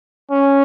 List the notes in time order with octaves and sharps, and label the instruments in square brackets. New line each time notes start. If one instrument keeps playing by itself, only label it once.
[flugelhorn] C#4